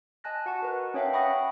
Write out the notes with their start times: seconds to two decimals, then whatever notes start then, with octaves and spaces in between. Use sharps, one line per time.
0.24 D#5 G#5 A5 F#6 A#6
0.46 F#4 F#5 G#5 A5 C#6
0.62 A#4 B4
0.94 C#4 C#5 E5 F5 G5
1.13 F#5 G5 B5 C#6 D#6 A#6